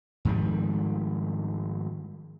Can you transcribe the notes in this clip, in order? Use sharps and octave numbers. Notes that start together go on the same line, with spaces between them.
G#2 D#3 F3 G3